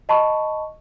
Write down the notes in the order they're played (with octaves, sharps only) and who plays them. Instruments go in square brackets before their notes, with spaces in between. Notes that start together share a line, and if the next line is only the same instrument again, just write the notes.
[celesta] D#5 A5 B5 C#6